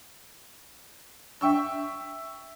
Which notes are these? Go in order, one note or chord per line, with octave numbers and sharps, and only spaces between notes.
E5 G5 C#6 E6